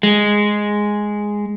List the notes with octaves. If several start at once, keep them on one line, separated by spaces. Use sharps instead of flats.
G#3